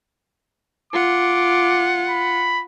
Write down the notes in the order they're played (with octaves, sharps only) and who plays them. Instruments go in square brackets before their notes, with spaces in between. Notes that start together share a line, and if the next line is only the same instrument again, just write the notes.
[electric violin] F4 F#5 [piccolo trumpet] D6
[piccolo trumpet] B5